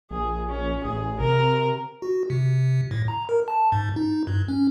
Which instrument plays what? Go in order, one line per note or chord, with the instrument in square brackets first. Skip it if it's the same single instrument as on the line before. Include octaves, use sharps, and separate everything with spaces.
[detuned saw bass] A#1 [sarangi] G#4
[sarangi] C#4
[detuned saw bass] A1 [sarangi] G#4
[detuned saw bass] C3 [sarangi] A#4
[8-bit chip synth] F#4
C3
A2
A#5
A#4
A5
G#2
D#4
G2
C#4